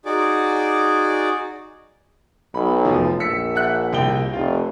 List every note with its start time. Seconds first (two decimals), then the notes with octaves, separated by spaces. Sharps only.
0.05 D#4 F#4 G#4 D5 D6
2.54 B1 B5
2.85 F1 F3
3.20 A#1 E6 B6 C#7
3.55 E5 F#5 F#6
3.93 C2 G5 G7
4.33 F1 F4